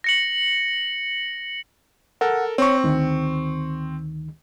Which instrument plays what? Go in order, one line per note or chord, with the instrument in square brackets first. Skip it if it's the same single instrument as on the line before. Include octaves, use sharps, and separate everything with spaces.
[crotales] A#6 C#7 F#7
[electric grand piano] A4 A#4 [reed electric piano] F#5
[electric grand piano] C4 C#6 [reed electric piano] C#5
[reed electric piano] D2 D#3